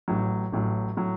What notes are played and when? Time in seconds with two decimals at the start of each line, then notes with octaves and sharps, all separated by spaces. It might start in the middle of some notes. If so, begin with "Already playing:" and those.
0.08 A1 A2 F#3
0.52 A1 A2 F#3
0.97 A2 F#3